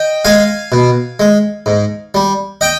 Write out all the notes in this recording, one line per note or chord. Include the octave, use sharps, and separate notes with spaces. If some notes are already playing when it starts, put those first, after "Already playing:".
Already playing: D#5 G5
G#3 F5 G#5
B2
G#3
G#2
G3
D#5 G5